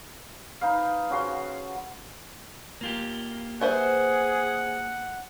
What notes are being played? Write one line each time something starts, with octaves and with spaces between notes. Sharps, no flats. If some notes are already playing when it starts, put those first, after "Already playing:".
D#4 B4 F5
C#3 F#4 C6
A#3 F4 G4
G#4 B4 C5 E5 F#5